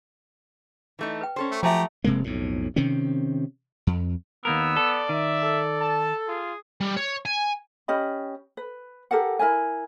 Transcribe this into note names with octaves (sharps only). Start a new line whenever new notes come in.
E3 A3 D#4
B4 G5
C#4 A4 C5
A3
F3 F#3 A3 G4 E5 G#5 A#5
F1 C3 G#3 A#3
B1 F2 A2
C3 D#3 C4 C#4
F2
D#2 A#3 B3 A#4 E6
A4 D5
D#3 E5
A4
A5
F4 G#4
G3
C#5
G#5
C#4 G4 D#5 B5
B4
G4 A4 A#4 F#5
E4 A#4 B4 G#5